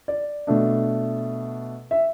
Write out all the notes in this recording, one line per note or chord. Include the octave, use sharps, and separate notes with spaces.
D5
B2 A3 D4
E5